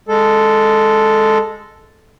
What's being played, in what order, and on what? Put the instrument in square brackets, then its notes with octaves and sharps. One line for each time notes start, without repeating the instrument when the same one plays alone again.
[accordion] G#3 A4